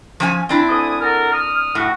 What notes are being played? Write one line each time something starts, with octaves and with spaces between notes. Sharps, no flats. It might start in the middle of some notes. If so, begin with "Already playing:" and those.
F3 C#4 G#5
C4 D4 E4
D2 G#5 D#6
F#4 A4 A#4
D#6 F6
A2 F#4